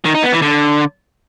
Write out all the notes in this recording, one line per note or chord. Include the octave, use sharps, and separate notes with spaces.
D#3
D#4
B3
E3
D3